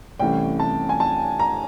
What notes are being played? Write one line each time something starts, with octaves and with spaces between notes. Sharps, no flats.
C2 C3 E3 A3 C#4 G5
A5
G#5
A5
A#5